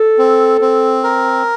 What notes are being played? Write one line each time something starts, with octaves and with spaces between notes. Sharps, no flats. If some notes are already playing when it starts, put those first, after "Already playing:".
Already playing: A4
C4
C4
A#4